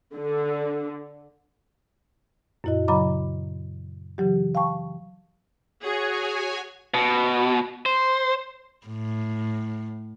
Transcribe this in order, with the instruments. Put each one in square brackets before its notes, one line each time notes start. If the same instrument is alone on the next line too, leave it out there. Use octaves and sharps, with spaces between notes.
[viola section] D3
[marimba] F#2 A#2 E4 F#4 D#5
C#3 F#3 D#5 A#5 B5 D6
C#3 E3 F#3 G4
F5 G5 A5 C#6
[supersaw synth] F#4 C#5 G#5 [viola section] G#4
[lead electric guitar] B2
C5
[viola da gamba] A2